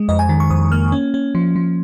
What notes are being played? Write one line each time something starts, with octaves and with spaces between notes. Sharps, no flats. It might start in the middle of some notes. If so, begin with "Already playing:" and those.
Already playing: G#3
F2 D#5
G#5
D#3
C#6
F2 D#6
A#3 F6
C#4
C#4
F3
F3